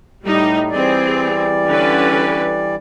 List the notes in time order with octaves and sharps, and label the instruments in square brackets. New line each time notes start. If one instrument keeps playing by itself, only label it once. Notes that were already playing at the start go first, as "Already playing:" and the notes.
[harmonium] A2 [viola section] G3 D#4
[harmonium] E3 G3 D5 [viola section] C4 G#4
[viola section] D3 C#4 B4